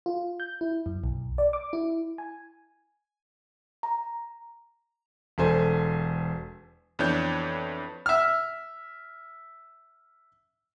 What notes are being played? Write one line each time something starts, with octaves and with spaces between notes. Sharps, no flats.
F4
G6
E4
F#2
B1
D5
D6
E4
G#5
A#5
E1 A4 C5 G#5
F2 E3 B3 D4 C#5 G6
E5 F6